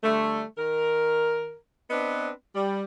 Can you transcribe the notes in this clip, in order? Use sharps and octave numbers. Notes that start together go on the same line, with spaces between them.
D3 G3 A3
D#3 A#4
B3 C4 D4 B4 D#5
G3